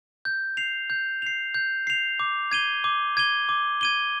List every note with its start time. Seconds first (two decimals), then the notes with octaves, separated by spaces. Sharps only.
0.25 G6
0.57 C7 F7
0.90 G6
1.22 C7 F7
1.54 G6
1.87 C7 F7
2.20 D6
2.51 G#6 D#7 G7
2.84 D6
3.17 G#6 D#7 G7
3.49 D6
3.81 G#6 D#7 G7